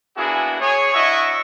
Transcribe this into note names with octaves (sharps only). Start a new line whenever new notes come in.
A#3 B3 D4 E4 F#4 G#4
G#4 C#5
D4 E4 F#4 D#5 E5 C#6